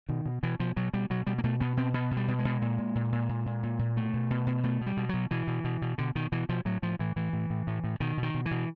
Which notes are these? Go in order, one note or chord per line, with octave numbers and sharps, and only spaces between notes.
B2 D#3
B2
B2 E3
B2 F3
B2 F#3
B2 G3
B2 F#3
B2 G3
A#3
B2 A3
B2 B3
B2 C4
B2 B3
B2
G3
B2
G#3
B2
A#2
A#2
A#2
A#2
A#2
A#2
A#2
A#2
B2 A3
B2
B2
B2
B2 A3
B2
G3
B2
B2 F#3
B2 E3
B2
B2
B2
B2 D3
B2 D#3
B2 E3
B2 F3
A2 F#3
A2 F3
A2 E3
A2 E3
A2
A2
A2
A2
B2 D#3
B2
D#3
B2
E3
B2